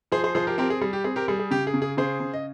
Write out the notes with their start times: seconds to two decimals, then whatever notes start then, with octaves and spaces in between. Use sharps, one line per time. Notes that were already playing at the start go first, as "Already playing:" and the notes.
0.12 F3 G#4 C5
0.24 G#4 C5
0.35 F3 G#4 C5
0.47 G4 A#4
0.58 C4 G4 A#4
0.70 G#4
0.81 G3 G#4
0.93 G4
1.04 C4 G#4
1.16 G4 A#4
1.28 G3 G#4
1.39 G#4
1.51 C#3 G4
1.67 G#4
1.74 C#3
1.82 G#4
1.97 C#3 G#4 C5
2.20 C#3
2.34 D#5